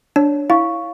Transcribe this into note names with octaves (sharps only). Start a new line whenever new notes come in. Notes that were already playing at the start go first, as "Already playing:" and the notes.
D4 C#5
E4 F5 C#6